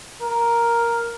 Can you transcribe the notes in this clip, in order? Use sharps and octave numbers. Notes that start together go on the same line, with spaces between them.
A#4